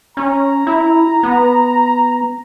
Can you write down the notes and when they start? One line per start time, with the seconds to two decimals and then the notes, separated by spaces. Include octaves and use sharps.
0.17 C#4 A#5
0.67 E4
1.23 B3